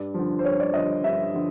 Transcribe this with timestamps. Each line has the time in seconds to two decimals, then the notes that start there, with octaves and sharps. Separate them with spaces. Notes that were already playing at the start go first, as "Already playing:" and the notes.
Already playing: G2 D5
0.14 D3 F3
0.39 C5
0.45 G2 C#5
0.60 D5
0.74 D3 F3 D#5
1.04 G2 E5
1.34 D3 F3